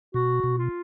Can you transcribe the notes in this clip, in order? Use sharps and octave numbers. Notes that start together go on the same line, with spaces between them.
B2 F#4
B2
F4